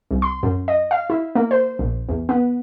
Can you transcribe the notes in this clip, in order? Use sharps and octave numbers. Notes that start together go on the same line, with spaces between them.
C2
C6
F#2
D#5
F5
E4
A#3
C5
A#1
E2
B3